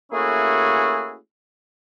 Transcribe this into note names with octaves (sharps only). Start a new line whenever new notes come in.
A3 A#3 C#4 E4 F#4 G#4